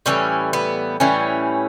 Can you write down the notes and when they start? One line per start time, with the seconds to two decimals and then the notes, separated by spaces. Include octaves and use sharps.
0.06 A2 E3 G3 C#4
0.53 B3
1.00 A2 E3 G3 C#4